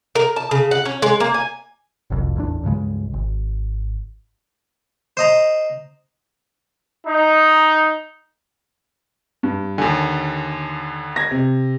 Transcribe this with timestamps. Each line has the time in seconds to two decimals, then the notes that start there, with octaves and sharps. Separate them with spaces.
0.15 A#4
0.36 A5
0.51 C#3
0.71 F#5
0.85 C#4
1.02 G#3
1.20 A#3
1.34 G#5
2.10 F#1 C2 F2
2.36 A1 E2 D4
2.63 C#2 G2 C#3 G#3
3.14 G#1
5.17 C5 D#5 A#5
7.06 D#4
9.43 G2
9.78 D#2 D3 G#5
11.16 G#6 A#6
11.31 C3